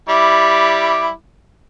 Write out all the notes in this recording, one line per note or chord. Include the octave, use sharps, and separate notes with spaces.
G3 E4 D6